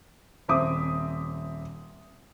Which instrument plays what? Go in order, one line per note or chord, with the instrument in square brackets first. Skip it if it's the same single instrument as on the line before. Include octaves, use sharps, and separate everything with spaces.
[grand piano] D#1 C4 E5 D6 D#6